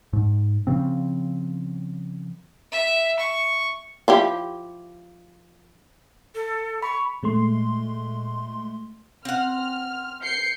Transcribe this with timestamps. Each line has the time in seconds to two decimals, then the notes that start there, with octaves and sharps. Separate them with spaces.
0.13 G#2
0.67 C#3 F3 C4
2.72 E5
3.20 C#6
4.08 F3 E4 G4
6.35 A4
6.82 B5 C#6
7.23 A#2 G#3 A3 C6
9.25 C4 F#5 F6
10.23 G6 C7 C#7